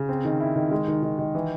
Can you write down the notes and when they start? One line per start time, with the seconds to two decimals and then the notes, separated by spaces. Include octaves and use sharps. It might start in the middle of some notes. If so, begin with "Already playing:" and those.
Already playing: C#3
0.09 C4
0.25 D#3
0.40 E4
0.56 D#3
0.71 G#3
0.88 D#3
1.03 D#3
1.19 D#3
1.35 E3